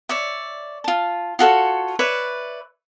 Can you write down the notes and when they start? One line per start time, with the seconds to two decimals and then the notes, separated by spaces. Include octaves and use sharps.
0.09 C#5 D5 E5
0.84 F4 A5
1.39 F4 F#4 A4 C#5
1.99 B4 C#5 D5 E5